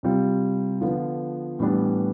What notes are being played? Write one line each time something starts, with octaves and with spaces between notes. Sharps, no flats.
C3 G3 C4 F4
D3 F3 B3 F4
A2 E3 G3 B3 D4